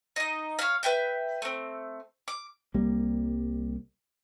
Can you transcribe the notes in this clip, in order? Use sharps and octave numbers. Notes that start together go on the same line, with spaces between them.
D#4 D#5
C#5 F5
B4 E5 G5 G6
A3 C4
D6
C2 G3 A#3